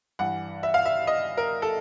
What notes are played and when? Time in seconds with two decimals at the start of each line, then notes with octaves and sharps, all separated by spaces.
0.19 G2 E3 F#5
0.63 E5
0.74 F5
0.85 E5
1.07 D#5
1.37 A#4
1.62 A4